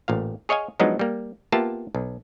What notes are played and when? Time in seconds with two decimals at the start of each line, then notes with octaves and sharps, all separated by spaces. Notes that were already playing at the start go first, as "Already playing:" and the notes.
0.08 A1 A#2 F5
0.49 G#4 C#5 D#5 F5 G#5
0.80 F3 F#3 G#3 B3 D4 D#4
0.99 G3 A#3
1.52 A#3 B3 F4 G4 E5 A5
1.95 B1